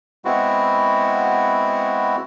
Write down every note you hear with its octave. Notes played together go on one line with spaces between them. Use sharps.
G#3 B3 C4 E4 F#4